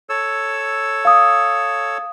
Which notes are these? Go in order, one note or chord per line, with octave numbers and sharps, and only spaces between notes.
A4 C#5 E6
F5 D#6